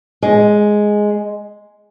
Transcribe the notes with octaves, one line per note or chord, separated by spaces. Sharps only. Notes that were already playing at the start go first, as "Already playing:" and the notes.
G#3